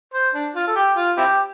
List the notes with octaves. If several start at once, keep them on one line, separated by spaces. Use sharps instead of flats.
C5
D4
F4
A4
G4
F4
C4 E4 G4